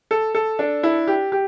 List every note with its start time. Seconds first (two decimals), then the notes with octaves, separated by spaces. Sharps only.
0.11 A4
0.35 A4
0.59 D4
0.83 E4
1.07 G4
1.32 G4